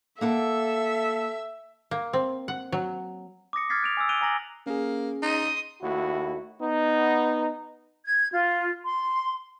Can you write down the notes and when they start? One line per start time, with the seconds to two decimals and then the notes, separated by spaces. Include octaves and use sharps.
0.21 A#3 A4 E5 F#5 A5
1.91 A#3
2.13 C4
2.48 F#5
2.72 F#3
3.53 D6 D#6 A#6 C#7
3.70 D6 F6 G#6 A6 B6 C7
3.82 F#6 D7 F7
3.97 G#5 D6 E6
4.09 F#6 D7 D#7 F7 G7
4.21 G#5 A#5 A#6 F#7
4.67 A#3 C#4 G#4
5.22 D#4 C6 D#6
5.81 D#2 A3 E4 F#4
6.61 B3 D#4
8.06 G#6
8.32 F4
8.84 C6